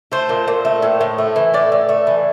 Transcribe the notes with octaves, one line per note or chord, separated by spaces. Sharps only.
A3 C5
A#2
A#2
A3
A2
A2
A3
E3
A2 D5
A2
A3
E3